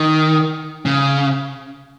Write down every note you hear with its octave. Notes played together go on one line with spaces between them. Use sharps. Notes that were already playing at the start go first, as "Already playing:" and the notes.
Already playing: D#3
C#3